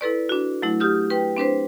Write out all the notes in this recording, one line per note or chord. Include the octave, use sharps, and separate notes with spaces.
E4 A4 B4 D5
D4 F#4
F#3 A3 E4
G4 D#6 F6 G6
B4 G5
C4 D4 B4 C5